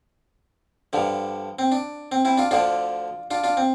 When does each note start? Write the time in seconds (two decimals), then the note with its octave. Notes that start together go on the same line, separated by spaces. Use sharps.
0.93 G2 D3 F3
1.59 C4
1.72 D4
2.12 C4
2.25 C4 E4
2.38 D4 F4
2.51 D2 D3 F3 D4 F4
3.31 D4 F4
3.44 D4 F4
3.57 C4